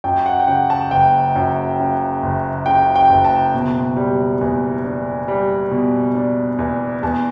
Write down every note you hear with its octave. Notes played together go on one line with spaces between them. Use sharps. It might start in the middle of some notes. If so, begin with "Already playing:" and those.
F#2 G5
F#5
G5
C#3 F#5
A5
F#1 G5
F#2
C#3
F#1
C#3 G5
G5
F#1
A5
B2
G3
E2
D4
G3
B2
D4
E2
E2 A5